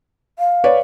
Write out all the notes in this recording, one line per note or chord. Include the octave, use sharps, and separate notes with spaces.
F5
B4 C#5 D5